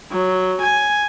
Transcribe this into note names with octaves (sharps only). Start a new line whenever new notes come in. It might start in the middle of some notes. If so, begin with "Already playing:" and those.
F#3
G#5